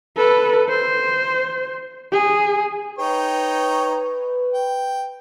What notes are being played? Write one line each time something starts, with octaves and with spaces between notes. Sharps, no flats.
A4 B4
C5
G#4
D#4 B4 C#5 G5
G5